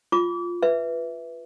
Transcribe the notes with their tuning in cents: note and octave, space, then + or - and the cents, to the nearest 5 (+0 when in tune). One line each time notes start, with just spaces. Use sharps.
F4 +0 D6 -35
B4 +0 E5 +0